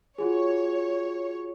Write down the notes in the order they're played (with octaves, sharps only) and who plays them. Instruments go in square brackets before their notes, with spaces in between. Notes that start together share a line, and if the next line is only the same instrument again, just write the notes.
[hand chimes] F4 F#4 G#4 [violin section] C#5